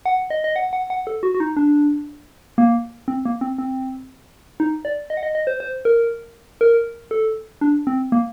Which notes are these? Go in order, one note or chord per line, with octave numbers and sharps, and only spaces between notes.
F#5
D#5
D#5
F#5
F#5
F#5
A4
F#4
F#4
D#4
D4
A#3
C4
A#3
C4
C4
D#4
D5
D#5
F#5
D#5
D#5
C5
C5
A#4
A#4
A4
D4
C4
A#3